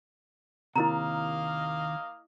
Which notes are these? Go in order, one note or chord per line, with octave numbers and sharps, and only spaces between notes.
D#2 C3 A#3 E4 A#4 D#5 F5 A#5